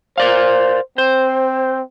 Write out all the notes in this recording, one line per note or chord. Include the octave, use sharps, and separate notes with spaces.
A#4 C5 D5 F5
C4 C5